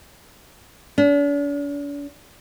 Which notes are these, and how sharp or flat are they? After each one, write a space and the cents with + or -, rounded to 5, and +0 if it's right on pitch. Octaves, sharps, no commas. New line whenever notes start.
D4 -45